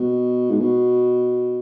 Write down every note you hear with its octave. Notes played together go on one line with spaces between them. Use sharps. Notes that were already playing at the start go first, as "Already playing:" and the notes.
Already playing: B2
G#2
B2